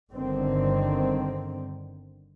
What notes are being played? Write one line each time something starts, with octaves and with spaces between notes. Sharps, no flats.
G1 D3 D#3 C4